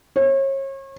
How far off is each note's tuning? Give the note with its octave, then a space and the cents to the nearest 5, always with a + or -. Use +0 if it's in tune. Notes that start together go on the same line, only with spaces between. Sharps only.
C#5 -35